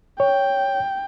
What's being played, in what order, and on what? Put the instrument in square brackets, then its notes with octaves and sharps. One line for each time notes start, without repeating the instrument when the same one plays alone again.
[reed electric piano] C#5 [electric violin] G5